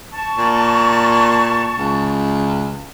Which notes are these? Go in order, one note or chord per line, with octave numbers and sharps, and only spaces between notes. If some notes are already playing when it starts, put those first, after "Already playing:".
A5 C#6
A#2
C#2